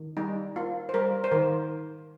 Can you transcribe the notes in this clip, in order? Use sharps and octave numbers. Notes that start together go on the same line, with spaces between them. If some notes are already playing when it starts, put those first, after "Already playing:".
Already playing: D#3
G3 D#4
A#3 F4
C5
G3 A#4
C5
D#3 A#4